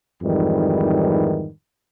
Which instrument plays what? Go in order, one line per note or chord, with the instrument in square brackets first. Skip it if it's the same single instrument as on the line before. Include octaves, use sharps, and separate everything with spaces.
[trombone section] F2 G#2 D#3 E3 G3